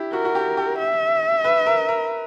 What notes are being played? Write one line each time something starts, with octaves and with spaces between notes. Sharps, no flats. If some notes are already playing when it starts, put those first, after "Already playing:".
Already playing: E4 G4
F#4 A#4
F#4
G4
G4
E5
B4
A#4
A#4